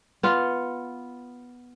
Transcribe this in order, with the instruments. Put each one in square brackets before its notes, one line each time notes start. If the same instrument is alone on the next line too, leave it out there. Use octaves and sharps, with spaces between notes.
[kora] B3 F4